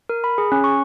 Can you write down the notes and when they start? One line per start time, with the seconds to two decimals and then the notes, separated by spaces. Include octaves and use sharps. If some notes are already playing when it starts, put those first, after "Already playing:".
0.09 A#4
0.24 B5
0.38 G#4
0.52 C#4
0.64 C#6